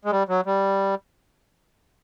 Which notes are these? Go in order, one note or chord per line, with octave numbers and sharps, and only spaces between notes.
G#3
G3
F#3
G3